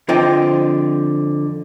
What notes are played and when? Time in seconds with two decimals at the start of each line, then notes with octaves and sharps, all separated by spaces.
0.09 F2 D3 F4 C5 D#5 G5